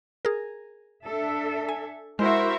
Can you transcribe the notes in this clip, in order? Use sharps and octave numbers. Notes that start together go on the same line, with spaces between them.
G#4 A#4
D4 A4 E5
G#5
G#3 E4 F#4 A#4 C5 E5